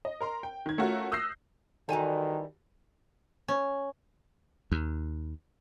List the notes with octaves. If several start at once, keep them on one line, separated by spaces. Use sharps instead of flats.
D#5
A#4 A#5 C6
G5
D#3 G#6
A3 C#4 F4 F#4 A#4
D#6 E6 F#6 G6 A#6 C7
D#3 E3 G3 F#4 A4 C5 G#5 A#5
C#4
D#2